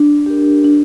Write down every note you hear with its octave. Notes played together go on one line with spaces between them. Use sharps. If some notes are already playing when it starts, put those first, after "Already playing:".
Already playing: D4
G4 A#4
D4